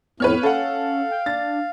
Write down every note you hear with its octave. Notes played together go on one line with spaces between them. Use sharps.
F2 A2 B3 B4 C#5 F6
C#4 A4 F5 F#5
G5
D4 A6